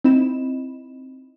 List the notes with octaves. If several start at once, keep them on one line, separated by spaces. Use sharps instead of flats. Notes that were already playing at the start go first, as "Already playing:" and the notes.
C4 D#4 E4 D#5 B5 E7